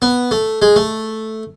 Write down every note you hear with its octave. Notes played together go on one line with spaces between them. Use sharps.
B3
A3
G#3
A3